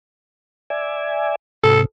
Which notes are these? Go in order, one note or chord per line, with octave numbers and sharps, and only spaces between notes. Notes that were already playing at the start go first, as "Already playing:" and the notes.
D5 E5 G#5
G#2 C3 A4